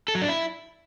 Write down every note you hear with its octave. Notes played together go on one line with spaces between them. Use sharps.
A4
F#3
D4
E4